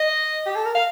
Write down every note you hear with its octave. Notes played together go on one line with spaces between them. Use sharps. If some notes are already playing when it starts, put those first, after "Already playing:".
Already playing: D#5
G4
A4
A#4
F5